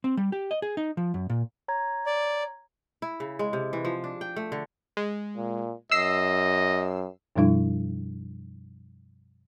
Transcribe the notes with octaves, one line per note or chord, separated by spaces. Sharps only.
C4
G3
G4
D#5
G#4
D#4
F3
F#2
A#2
C#5 A#5 G#6
D5
E4
C#3
G#3
C3
E3
F3
D4
G5
A3
D3
G#3
A#2
F#2 D#5 E6 C7
F#2 B2 F3 G3 D4 E4